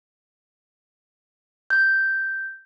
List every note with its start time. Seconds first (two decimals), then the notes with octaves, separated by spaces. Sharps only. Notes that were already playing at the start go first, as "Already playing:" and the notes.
1.70 G6